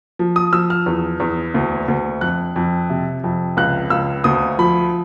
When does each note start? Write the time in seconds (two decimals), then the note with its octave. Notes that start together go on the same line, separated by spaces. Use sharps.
0.19 F3
0.36 D#6
0.53 F3 E6
0.70 F6
0.86 E2
1.20 E2
1.54 D2
1.88 D2
2.21 F2 F#6
2.56 F2
2.90 C3
3.24 F2
3.57 C#2 F#6
3.90 C#2 E6
4.24 D2 D#6
4.59 F3 B5